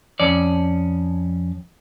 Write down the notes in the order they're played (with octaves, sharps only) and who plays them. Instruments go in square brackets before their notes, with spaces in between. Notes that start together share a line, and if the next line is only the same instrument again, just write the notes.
[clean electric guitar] F2 C#4 D5